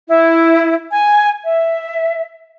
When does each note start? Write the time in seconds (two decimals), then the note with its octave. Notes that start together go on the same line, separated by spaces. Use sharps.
0.07 E4
0.90 G#5
1.44 E5